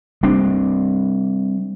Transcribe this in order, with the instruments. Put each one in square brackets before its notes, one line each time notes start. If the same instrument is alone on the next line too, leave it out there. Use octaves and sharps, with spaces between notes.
[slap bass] G3 C4 D4